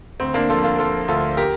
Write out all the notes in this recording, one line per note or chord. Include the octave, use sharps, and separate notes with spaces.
D2 C4
A#3 D4
F3 F4 A4
F4 A4
F3 F4 A4
D2 F4 A4
G4 A#4